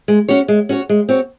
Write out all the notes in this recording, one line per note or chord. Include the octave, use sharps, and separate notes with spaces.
G#3
C#4 F#4 C#5
G#3
C#4 F#4 C#5
G#3
C4 F#4 C#5